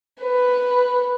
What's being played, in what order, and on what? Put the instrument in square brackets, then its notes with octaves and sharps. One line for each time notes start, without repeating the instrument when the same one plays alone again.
[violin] B4